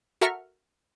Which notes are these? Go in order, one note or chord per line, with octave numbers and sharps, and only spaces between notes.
F#4 A4 A#4 E5 C#6 F6